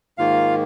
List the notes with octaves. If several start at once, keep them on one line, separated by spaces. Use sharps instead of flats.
G#2 D#3 A#3 F4 F5